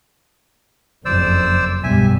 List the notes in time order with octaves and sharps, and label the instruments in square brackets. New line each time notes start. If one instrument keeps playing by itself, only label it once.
[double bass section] F#1 F2 [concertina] C5 D5 E6
[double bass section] B1 G2 G3 [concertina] E5 G#5